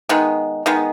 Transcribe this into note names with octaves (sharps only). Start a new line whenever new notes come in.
D#3 G#3 B3
D#3 G#3 B3